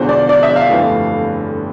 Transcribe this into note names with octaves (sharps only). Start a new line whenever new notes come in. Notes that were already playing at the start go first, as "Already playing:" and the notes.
Already playing: E1 E2 D3 F3 C5
D5
D5
E5
F5
G1 F2 E3 A3